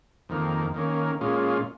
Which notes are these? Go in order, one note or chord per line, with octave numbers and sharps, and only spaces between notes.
F2 D#3 A#3
D#3 A#3 C#4
A#2 G#3 C#4 F4